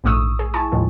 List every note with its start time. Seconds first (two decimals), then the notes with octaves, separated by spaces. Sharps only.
0.04 A#1 G#2 A3 C#6 D#6 E6
0.39 G#4
0.54 E4 G#5 A5 C#6
0.72 D#2 A2 D#3 F3 G#3